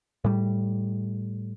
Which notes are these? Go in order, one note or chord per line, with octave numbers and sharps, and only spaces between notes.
A2 G3